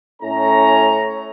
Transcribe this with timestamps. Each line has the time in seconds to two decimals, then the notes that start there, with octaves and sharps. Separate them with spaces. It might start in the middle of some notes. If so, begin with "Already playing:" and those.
0.22 A2 A3 C#4 A#5